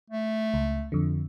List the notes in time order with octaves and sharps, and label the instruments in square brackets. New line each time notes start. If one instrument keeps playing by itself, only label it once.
[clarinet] A3
[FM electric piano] C#2
F2 D3